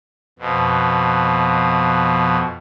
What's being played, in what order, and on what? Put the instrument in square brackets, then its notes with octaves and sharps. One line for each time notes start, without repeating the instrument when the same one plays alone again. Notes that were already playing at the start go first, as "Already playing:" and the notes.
[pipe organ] F2 B2